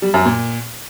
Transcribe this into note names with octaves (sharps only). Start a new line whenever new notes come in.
G3
F#2
A#2